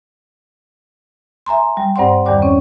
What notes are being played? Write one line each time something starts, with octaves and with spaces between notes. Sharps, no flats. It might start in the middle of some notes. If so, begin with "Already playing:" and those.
E5 G#5 A#5 C6
G3
G2 C4 C5 D5 F#5 C6
E2 G2 D#3 G3 D5 D6
C4 C#4 C#5